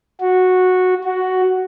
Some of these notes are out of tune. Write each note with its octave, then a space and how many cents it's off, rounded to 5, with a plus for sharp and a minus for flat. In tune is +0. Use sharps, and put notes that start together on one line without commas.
F#4 -10
F#4 +5